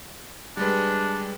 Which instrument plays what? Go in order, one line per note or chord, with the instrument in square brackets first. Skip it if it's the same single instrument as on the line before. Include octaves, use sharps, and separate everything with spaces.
[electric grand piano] G3 G#3 B4 [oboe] D4